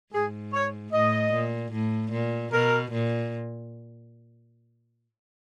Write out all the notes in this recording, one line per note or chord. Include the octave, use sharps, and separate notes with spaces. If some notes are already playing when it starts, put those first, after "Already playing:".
G#2 G#4
C#5
A2 D#5
A#2
A2
A#2
B2 A#4
A#2